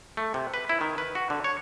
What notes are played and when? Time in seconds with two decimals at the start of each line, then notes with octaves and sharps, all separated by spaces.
0.17 A3
0.34 C3
0.54 B4
0.69 E4
0.81 D#3
0.98 B4
1.15 F#4
1.30 D3
1.44 C#5